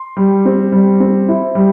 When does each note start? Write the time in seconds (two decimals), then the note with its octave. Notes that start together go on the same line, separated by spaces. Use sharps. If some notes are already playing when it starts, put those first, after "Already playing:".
Already playing: C6
0.17 G3
0.45 C4
0.72 G3
1.00 C4
1.29 E4
1.55 G3